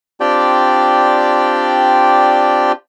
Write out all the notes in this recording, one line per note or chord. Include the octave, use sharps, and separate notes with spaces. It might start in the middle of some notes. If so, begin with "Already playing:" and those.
C4 D4 F4 G4 D5 G5